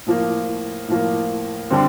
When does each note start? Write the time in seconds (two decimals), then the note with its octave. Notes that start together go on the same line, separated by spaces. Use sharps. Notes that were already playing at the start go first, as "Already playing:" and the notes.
0.06 A2 F3 A#3
0.88 A2 F3 A#3
1.70 D3 G3 C4